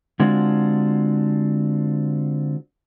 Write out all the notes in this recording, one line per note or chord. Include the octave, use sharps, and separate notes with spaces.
D3 G#3 C4 D4 F4 F#4